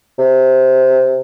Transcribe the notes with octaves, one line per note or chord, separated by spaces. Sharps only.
C3